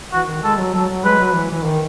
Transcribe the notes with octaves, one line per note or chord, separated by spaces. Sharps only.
E3 F#4
D#3
G#3 A4
F#3
F#3 A4
F#3
G#3 B4
F#3
E3
E3
D#3